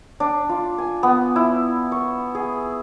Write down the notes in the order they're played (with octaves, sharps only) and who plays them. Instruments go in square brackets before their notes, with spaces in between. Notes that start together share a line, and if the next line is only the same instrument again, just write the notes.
[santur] D4
F4
G#5
B3
E4
C#6
G#4